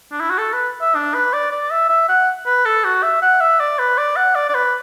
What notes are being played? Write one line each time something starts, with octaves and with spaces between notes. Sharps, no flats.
D4
E4
F#4
A4
B4
E5
D4
B4
D5
D5
E5
E5
F#5
B4
A4
F#4
E5
F#5
E5
D5
B4
D5
F#5
D5
D5
B4